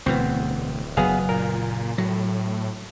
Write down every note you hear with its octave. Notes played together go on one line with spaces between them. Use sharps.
D1 D2 B2 E3 B3 C4
F#1 F#3 B3 G#4 F5
A#2 A#4
A2 F#3